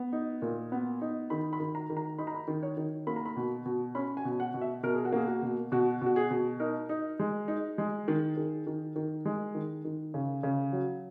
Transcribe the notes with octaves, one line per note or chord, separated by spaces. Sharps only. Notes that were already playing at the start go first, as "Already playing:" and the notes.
Already playing: B3
D#4
A#2
B3
D#4
D#3 B5
B5
D#3
A#5
D#3
A#5
D#4 B5
A#5
B5
D#3
C#5
D#3
A#3 B5
A#5
B5
B2
B2
C#4 B5
G#5
B2
F#5
B2
E5
B2 A#4
G#4
F#4
A#3 G#4
F#4
B2
B2 F#4
B2 F#4
G#4
B2
D#4 A#4
D#4
G#3
D#4
G#3
D#3
D#3 G#4
D#3
D#3
G#3
D#3
D#3
C#3
C#3
F#3